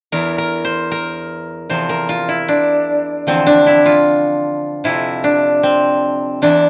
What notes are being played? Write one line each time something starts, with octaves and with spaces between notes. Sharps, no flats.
E2 E3 A#4
A#4
C5
A#4
E2 C3 F3 C5
A#4
F4
E4
D4
E2 D3 F3 C4
D4
E4
F4
F2 C3 F3 E4
D4
C4
E2 E3 D4